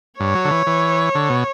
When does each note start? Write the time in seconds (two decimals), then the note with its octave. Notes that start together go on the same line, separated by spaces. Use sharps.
0.19 G2 C#5
0.35 F#3
0.45 D3
0.51 E3
0.67 E3
1.15 D3
1.29 B2